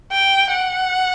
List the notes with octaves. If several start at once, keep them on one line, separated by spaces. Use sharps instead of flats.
G5
F#5